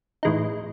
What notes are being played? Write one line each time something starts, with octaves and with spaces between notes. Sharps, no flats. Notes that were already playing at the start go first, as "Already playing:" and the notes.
A2 E3 G#3 D#4